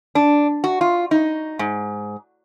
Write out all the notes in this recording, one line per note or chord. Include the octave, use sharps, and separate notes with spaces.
D4
F#4
F4
D#4
G#2